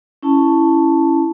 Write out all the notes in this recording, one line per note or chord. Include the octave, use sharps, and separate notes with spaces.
C#4 E4 A5